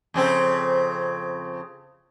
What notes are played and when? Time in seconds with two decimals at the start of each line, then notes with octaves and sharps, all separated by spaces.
0.14 F2 C#3 C4